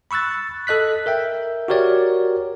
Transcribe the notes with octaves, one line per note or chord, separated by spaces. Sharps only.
B5 C#6 E6 F#6 A6
A4 D#5 F#6 B6
A#4 E5 G5
F#4 G4 A#4 C#5 D5